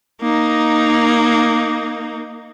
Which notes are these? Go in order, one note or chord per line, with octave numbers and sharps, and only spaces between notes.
A#3 D#4